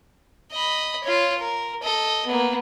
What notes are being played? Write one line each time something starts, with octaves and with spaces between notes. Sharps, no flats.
D#5 B5
F4 C#5
A#4
A4 D#5
A#3 B3